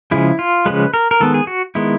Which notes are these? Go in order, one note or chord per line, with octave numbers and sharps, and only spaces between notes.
C#3 F3 G#3 E4
F4
C#3 F3 G#3 B4
A#4
A#4
D#3 G#3 B3 A4
G#4
F#4
D#3 G#3 B3 E4